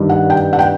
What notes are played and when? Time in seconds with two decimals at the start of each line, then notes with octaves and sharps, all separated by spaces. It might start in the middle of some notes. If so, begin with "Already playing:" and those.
Already playing: G2 D#3 G3
0.09 F#5
0.30 G5
0.53 F#5
0.59 G5